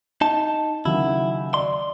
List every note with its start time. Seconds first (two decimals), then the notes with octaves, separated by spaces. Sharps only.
0.21 D#4 A5
0.85 D#2 C#3 F#3 E4
1.54 D5 C6